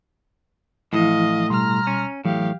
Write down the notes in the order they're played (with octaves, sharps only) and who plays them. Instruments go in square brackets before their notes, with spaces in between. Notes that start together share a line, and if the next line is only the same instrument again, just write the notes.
[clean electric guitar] A2 [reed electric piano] E3 F3 E4 [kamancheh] D#5 F5
[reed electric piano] B2 G3 C6 [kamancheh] A#5 F6
[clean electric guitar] C#4
[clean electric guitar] A2 [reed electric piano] E3 F#3 [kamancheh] G4 F5